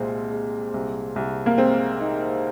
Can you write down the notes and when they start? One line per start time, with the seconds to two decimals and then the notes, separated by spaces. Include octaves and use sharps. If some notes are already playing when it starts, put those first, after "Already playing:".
Already playing: C2 A#2 G#3 C4
0.31 G#3
0.74 C2
1.16 C2
1.46 A#3
1.58 G#3 C4
2.00 D#4